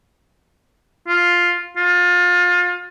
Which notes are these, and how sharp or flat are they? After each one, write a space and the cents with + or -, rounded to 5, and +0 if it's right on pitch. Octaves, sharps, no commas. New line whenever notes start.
F4 +5
F4 +30